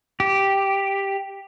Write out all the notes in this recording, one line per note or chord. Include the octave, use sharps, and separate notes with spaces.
G4